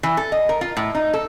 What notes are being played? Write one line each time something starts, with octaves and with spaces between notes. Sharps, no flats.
E3
A4
D#5
A#4
F4
A2
D#4
A4